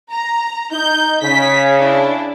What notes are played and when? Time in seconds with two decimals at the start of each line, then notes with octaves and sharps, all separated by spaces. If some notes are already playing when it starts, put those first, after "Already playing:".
0.11 A#5
0.72 D#4 G6
1.22 C#3 B6
1.79 D4 E4